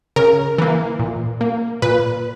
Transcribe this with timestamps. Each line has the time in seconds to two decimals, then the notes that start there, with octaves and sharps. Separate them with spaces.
0.16 C#3 A#4
0.58 E3 A#3
0.99 A#2
1.41 A#3
1.82 A#2 B4